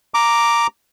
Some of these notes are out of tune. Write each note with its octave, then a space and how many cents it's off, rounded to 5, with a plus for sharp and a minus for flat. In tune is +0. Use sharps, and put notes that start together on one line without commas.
A#5 +0 D6 +0